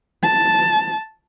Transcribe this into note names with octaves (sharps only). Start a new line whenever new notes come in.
A5